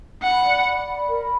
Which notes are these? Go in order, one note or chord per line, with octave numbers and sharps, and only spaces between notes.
F#5 B5
D5
D5
B5
A#4